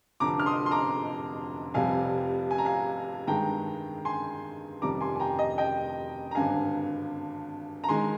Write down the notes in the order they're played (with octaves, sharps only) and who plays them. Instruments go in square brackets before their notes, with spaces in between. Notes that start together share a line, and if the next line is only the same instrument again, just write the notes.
[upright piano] F1 F2 D3 A#5 D6
F6
C6 D#6
C6
A#5 D6
F1 F2 C3 G3 F5 G#5
G#5
A#5
F5 G#5
G2 D#3 G#3 G5 A#5
G#5 C6
F1 F2 D#3 G3 A#5 D6
G#5 C6
G#5
G5 A#5
D#5
D#5 G5
A#5
G#1 G2 D3 F5 G#5
A#5
D#3 G#3 G#5 C6